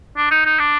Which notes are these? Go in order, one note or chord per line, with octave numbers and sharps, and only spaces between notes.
D4
D#4
D#4
D4